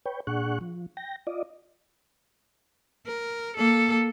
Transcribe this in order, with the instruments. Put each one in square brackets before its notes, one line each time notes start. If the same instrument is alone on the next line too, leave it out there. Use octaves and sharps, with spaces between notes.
[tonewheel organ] B4 C#5 G5
A#2 D4 G#4 F#5 C#6 F#6
F3
G5 A#6
F4 D5 D#5
[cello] A#4
A#3 A4